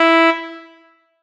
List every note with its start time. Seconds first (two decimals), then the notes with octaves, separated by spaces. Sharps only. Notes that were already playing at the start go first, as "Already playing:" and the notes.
Already playing: E4